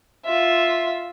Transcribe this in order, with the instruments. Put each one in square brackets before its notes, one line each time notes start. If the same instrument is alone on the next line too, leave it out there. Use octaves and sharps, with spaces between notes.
[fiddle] F4 E5